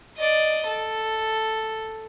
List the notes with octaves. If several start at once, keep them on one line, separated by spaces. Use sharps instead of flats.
D5 D#5
A4